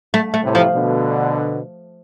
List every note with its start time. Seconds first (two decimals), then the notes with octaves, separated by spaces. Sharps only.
0.14 A3
0.34 A3
0.44 A2 C3
0.55 F3
0.74 B2 D3